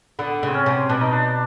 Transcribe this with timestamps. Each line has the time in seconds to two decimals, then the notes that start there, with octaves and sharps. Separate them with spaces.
0.19 D3 B3
0.43 C#3 C4
0.54 C#4
0.66 C3
0.89 B2 D4
1.01 D#4
1.12 D4